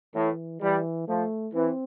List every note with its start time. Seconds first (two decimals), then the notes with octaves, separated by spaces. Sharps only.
0.15 A2 E3
0.62 E3 G3
1.08 F3 A3
1.54 E3 C4